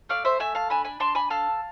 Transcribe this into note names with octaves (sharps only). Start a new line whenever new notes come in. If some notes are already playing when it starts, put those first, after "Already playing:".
A3 D5 F5
C5 E5
A3 E5 G#5
F5 A5
D4 G#5 B5
G#5 B5
D4 A5 C6
G#5 B5
A4 F5 A5